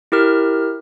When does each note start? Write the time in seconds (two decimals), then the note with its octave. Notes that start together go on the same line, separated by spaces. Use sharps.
0.12 E4 G4 A#4 F6